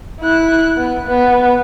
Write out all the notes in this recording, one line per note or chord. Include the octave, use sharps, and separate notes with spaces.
E4 F#6
B3
B3